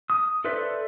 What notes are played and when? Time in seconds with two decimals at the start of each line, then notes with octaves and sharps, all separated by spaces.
0.10 D#6
0.44 A4 B4 C5 D5 E5